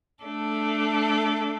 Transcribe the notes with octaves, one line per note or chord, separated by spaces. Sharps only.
A3 D4 A4